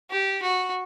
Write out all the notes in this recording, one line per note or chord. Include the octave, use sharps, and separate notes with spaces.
G4
F#4